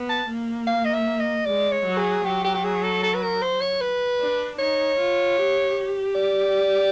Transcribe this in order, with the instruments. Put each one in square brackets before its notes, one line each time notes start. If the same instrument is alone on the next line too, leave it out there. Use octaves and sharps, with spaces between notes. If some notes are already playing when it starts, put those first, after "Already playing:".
Already playing: [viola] B3
[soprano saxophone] A5
[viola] A#3
[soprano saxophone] F5
D#5
E5
D#5
[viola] G#3 [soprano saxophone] D5
[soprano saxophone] C#5
[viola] F#3
[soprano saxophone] G#4
[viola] F#3 [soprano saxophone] G4
[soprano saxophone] G4
G4
G#4
A4
A4
B4
A#4
C5
C#5
B4
[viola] D4
[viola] D#4 [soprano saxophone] C#5
[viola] F4
G4
[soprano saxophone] D5